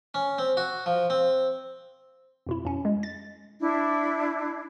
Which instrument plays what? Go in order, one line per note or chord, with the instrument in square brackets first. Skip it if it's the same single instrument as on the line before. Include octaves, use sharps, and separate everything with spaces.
[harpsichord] C#4
C4
F#4
F3
C4
[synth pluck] F2 B2 E4
F2 C#4
G#3
A6
[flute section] D4 E4